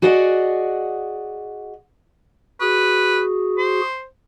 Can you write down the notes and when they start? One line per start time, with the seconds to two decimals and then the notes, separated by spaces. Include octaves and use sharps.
0.02 F#4 G#4 D5 D#5 F5 F#5
2.61 F#4 G#4 B4
3.58 C5